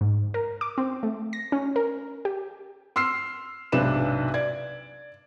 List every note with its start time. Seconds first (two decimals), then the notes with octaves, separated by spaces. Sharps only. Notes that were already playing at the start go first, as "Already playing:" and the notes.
0.01 G#2
0.34 A#4
0.61 D6
0.78 C4
1.03 A3
1.33 A#6
1.52 C#4
1.76 A#4
2.25 G4
2.96 C6 E6 F6 C7
3.72 B1 G#2 C3 D4 B4 E7
4.34 D5 G#6